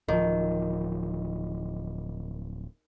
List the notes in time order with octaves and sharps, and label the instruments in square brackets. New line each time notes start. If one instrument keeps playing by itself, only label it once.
[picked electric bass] D1 F3 [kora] D#3